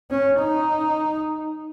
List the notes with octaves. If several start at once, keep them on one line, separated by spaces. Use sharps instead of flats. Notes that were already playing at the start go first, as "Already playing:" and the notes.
C#4
D#4